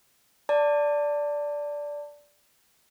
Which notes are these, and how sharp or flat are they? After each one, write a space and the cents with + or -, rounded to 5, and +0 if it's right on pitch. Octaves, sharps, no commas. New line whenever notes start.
D5 -10 A5 +25